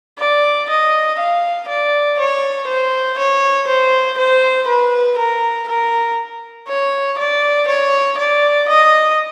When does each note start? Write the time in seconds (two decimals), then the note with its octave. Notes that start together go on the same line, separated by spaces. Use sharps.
0.19 D5
0.69 D#5
1.19 F5
1.68 D5
2.19 C#5
2.68 C5
3.18 C#5
3.68 C5
4.18 C5
4.68 B4
5.19 A#4
5.68 A#4
6.68 C#5
7.18 D5
7.67 C#5
8.18 D5
8.68 D#5